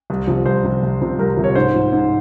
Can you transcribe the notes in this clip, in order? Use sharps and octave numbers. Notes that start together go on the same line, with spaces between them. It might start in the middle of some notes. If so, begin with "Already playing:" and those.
C2
C3 F3
C2 C5
C3 F3
C2
C3 F3
C2 A#4
C3 F3
C#5
G#2 C5
F3
G#2